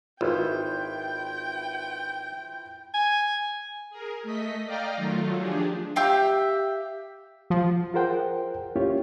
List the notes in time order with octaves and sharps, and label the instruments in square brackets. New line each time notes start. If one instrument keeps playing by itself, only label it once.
[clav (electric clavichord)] G#1 [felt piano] E4 F4 B4 [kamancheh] G5
[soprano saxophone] G#5
[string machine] G#4 A#4
A3 D#5 B6
D5 D#5 F5 G5 A#5 F6
D#3 F#3 A3 F4
F3 D4 G4 G#4
[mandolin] G4 E5 F5 G5
[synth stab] F3
[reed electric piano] F4 G#4 A#4 C5 F#5 G5
A#3 C#4 E4 F4 G4 C#5